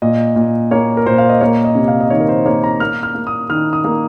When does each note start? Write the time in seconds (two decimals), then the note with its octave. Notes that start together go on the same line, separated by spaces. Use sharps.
0.02 A#2 D#5
0.36 A#2
0.71 A#3 C#5
0.97 A#4
1.06 A#2 C5
1.18 F5
1.29 D#5
1.40 A#3 C#5
1.64 D#5
1.75 C3
1.88 F5
2.00 D#5
2.10 D#3 C#5
2.20 A#4
2.29 C5
2.46 A#3 C#5
2.64 A#5
2.80 A#3 F6
3.03 F6
3.15 A#3
3.27 D#6
3.50 D#3 F6
3.73 D#6
3.84 A#3